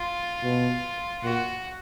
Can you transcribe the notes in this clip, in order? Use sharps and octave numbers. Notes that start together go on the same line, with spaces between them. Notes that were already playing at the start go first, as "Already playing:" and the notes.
Already playing: F4
B2
A#2 F#4